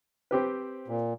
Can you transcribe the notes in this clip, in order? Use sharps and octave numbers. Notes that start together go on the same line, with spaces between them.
C4 G4 B4
A#2